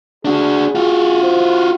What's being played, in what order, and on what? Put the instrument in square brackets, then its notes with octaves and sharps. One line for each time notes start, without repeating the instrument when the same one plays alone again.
[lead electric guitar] D4 F#4 [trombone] G#4
[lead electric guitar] F4 F#4
[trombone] C5